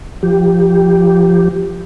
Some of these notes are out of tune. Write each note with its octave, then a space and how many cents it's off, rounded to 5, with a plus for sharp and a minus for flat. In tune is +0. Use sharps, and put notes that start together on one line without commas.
F3 -10 G4 +0